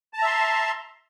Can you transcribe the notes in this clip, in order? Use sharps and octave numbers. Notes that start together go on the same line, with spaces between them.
E5 A5 A#5 C6